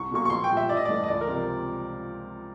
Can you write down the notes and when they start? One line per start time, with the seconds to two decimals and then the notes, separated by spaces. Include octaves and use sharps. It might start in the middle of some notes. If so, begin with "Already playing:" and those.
Already playing: C2 C#6
0.11 B2 F#3 A#3 C#6
0.25 C#6
0.30 A#1 C6
0.44 G5
0.50 A#2 G3
0.57 E5
0.69 A1 D5
0.77 D#5
0.85 G2 E3 A3 D5
1.04 D#5
1.08 C#2 D5
1.21 A#4
1.28 C3 F3